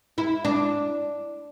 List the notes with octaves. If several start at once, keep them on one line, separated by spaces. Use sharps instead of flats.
E4
D4